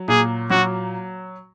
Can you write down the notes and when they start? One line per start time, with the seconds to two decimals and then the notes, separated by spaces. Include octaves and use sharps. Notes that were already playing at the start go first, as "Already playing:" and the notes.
Already playing: F#3
0.08 A#2 G#4
0.50 F#3 F#4